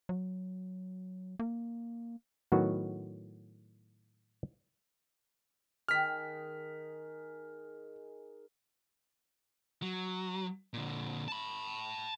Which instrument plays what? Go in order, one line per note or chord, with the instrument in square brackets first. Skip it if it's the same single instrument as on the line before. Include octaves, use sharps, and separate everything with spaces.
[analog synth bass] F#3
A#3
[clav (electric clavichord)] A2 D#3 F#3 B3 F#4
[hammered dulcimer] D#3 G#4 [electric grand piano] F6 B6
[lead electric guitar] F#3
A#2 D3
A5 B5